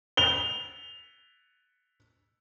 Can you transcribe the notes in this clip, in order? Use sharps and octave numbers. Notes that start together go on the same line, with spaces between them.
F7 G7